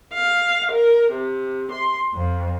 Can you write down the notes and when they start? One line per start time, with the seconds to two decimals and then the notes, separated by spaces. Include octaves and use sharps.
0.14 F5
0.73 A#4
1.12 C3
1.72 C6
2.13 F2